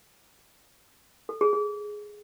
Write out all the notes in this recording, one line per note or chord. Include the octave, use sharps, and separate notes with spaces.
A4
G#4
G#4